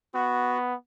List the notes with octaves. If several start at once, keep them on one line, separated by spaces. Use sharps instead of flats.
B3 F#4